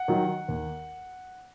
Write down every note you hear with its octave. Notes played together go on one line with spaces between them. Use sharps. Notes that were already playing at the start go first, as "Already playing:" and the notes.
Already playing: F#5
D#3 F#3
D#2